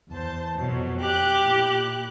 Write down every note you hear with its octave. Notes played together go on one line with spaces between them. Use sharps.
E2 C5 A5
F2 B2 F#3
G4 F#6
A#2 E4 F#6